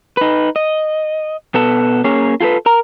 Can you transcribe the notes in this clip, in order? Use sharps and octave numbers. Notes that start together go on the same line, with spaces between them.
D#4 B4
D#5
B2 B3 A4
A#3 C#4 G#4 C#5
F4 G#4 A4 B4
A#4 A#5